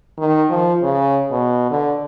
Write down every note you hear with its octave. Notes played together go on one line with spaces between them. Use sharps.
D#3
F3
C#3
B2
D3